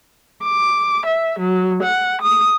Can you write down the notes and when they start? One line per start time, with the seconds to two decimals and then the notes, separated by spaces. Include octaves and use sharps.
0.44 D6
1.06 E5
1.40 F#3
1.83 F#5
2.21 D#6